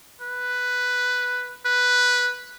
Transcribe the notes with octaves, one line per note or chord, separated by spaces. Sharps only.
B4
B4